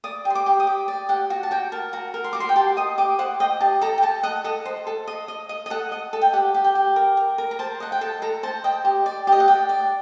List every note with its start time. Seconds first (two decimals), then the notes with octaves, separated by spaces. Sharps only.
0.04 D5 D#6
0.25 G4
0.30 C6
0.35 D6
0.46 G4
0.60 D#6
0.67 G4 D6
0.88 D5
1.09 G4 F#5
1.30 F#4 F#5
1.43 A5
1.51 F#4 G5
1.72 A#4 A5
1.93 F#4 A#5
2.14 A#4
2.24 C6
2.33 F#4 D6
2.40 C6
2.49 G5
2.56 G4 A5
2.77 D#5 D#6
2.98 G4 D6
3.19 C5 F#5
3.40 D#5 G5
3.61 G4 A5
3.81 A4 A#5
3.98 G5
4.03 A4 A5
4.23 D#5 F#5
4.44 A4 D#5
4.66 C5
4.87 A4
5.07 D#5
5.28 D#5
5.49 D#5
5.66 D#5
5.70 A4 F#5
5.92 D#5
6.13 A4
6.22 G5
6.33 G4 F#5
6.54 G4
6.64 G5
6.75 G4
6.96 A#4
7.17 A#4
7.38 A#4
7.51 A#5
7.59 C5 A5
7.80 D#5 F#5
7.92 G5
8.01 A4 A5
8.22 A4 A#5
8.43 C5 A5
8.64 D#5 G5
8.85 G4
9.06 D5
9.27 G4
9.32 D#5
9.40 F#5
9.48 D5 G5
9.69 D5